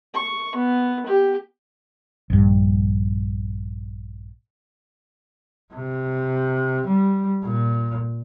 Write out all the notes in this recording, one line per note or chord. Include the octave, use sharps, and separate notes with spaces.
C#6
B3
G4
A#1 G2
C3
G3
A#2